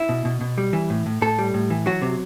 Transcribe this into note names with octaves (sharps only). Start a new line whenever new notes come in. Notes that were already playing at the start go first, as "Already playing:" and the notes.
Already playing: E4
B2
B2
B2
G3
E3
A2
A2
A2 A4
G3
A2
E3
F#3 F#4
C3